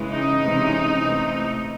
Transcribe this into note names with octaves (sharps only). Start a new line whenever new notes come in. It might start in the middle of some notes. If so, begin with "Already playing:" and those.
Already playing: C#3 E3 G#3
D#4
C3 E3 G#3 C#4
C3 E3 A3